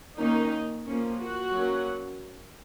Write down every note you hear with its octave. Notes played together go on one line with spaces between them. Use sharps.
D#3 A#3 C#4 D#4
F3 A#3 C#4
F#4
F#3 A#3 C#4